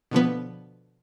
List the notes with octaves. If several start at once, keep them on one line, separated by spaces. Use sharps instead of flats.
B2 D3 F3 B3